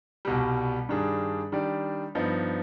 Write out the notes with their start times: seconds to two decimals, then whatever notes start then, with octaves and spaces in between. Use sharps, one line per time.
0.25 C2 B2 G3
0.89 G2 D#3 G3 D4 G#4
1.52 D#3 G3 D4 G4 D5
2.15 G2 F3 B3 D#4